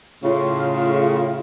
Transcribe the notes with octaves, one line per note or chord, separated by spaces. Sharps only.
A2 C#3 F4